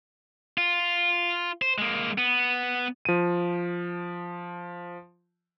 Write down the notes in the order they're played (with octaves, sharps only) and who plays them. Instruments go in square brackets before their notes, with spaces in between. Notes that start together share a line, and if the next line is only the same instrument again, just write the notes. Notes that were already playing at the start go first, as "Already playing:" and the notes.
[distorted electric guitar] F4
C5
G#3 A#3
B3
[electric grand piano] F3 D#7